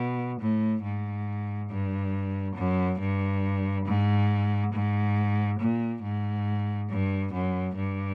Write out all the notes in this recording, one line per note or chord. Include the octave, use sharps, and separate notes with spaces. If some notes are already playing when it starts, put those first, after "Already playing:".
Already playing: B2
A2
G#2
G2
F#2
G2
G#2
G#2
A#2
G#2
G2
F#2
G2